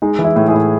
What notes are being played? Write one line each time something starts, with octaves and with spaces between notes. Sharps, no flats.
G#3 D#4
E3
E4
A2
E4 G#4
A2